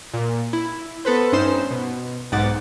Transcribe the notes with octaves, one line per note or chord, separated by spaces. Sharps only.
A#2
E4
B3 A4 B4 C5
G2 C#4 D#4 C5 C7 E7
B2
B1 G#2 D#4 F#5 D6 A6